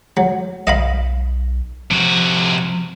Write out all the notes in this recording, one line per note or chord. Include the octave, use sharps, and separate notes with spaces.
F#3
B1 D#5 F5 B5
C3 F3 F#4